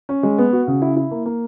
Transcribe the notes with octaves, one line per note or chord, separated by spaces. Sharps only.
C#4
G#3
B3
F#4
C#3
E4
E4
A#3
A#3